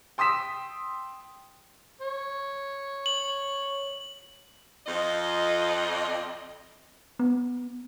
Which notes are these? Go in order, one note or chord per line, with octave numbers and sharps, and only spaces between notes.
G5 C6 D#6 E6 B6 E7
C#5
F#7
F2 D#5
B3